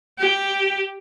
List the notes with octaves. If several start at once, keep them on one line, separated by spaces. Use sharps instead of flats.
G4